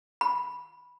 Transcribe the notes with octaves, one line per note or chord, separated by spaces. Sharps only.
B5